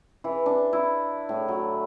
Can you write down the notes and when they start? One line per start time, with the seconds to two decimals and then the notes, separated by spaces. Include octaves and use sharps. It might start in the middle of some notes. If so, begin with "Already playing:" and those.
0.24 E3
0.46 D4
0.73 E4
1.29 A2
1.48 F#3